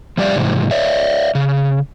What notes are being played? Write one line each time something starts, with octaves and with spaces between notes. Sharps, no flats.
F3 G3 G4 D5 E5 F5
G#2 C3 E3
C#5 D5 E5
C#3